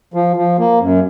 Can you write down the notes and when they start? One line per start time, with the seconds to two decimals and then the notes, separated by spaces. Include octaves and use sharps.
0.14 F3
0.36 F3
0.59 A#3
0.80 F#2